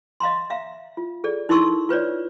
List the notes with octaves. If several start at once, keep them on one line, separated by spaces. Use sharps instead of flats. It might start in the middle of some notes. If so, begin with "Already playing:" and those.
D#5 F5 A#5 C6
E5 F5 A#5
F4
G#4 A4 D5
D#4 E4 A#4 C6 C#6 E6
F4 B4 C#5 D5